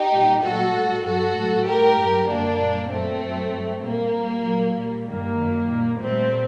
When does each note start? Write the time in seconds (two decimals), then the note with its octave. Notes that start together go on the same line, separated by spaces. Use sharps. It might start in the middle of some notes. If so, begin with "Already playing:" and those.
Already playing: D#4 G4
0.13 A#2 G3
0.43 A#2 F#3 F#4 A4
0.74 A2 G3
1.05 G2 F#3 F#4 A4
1.37 A2 F#3
1.67 A2 G3 G4 A#4
1.98 G2 F#3
2.29 F#2 D3 G3 A#3 D4
2.60 A#2 G3
2.91 F#2 F#3 A3 C4
3.22 F#2 F#3
3.53 G2 F#3
3.83 A#2 G3 A#3
4.14 A#2 G3
4.46 A#2 F#3
4.77 A#2 G3
5.08 G2 D#3 G3 A#3
5.38 F#2 D#3 F#3
5.69 A#2 G3
6.00 A#2 G3 A3 C4